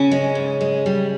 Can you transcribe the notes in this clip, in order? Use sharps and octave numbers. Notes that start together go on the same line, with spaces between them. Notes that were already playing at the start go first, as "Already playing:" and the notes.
Already playing: C#3 C#4
G#3
G#2
G#3
G3